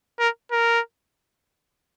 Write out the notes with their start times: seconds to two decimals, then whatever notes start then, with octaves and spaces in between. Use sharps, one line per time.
0.19 A#4
0.51 A#4